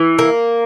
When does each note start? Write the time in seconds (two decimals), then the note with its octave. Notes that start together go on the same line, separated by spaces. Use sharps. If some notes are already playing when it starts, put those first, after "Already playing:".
Already playing: E3
0.19 A#3